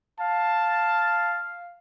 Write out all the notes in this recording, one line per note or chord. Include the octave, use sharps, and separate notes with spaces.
F5 A5